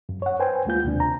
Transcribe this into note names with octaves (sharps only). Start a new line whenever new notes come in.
F#2
C#5 F#5
B4 C5 G5 G#5
D2 G#3 A#3 F4 G6
D#2 C3 D4
A#5